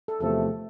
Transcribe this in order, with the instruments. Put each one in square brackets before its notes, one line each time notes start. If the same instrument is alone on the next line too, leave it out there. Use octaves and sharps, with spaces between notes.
[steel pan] A4
[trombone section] E2 C3 F3 A3 [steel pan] A4